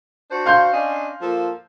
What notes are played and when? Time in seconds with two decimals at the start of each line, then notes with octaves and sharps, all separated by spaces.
0.30 D4 F#4 C5
0.46 F5 C6 G6
0.72 C#4 D4 D#5
1.21 F3 A#3 A4